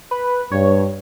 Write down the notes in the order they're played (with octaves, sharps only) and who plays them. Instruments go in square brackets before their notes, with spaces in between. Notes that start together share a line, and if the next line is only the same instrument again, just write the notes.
[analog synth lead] B4
[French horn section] G2 [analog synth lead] C#5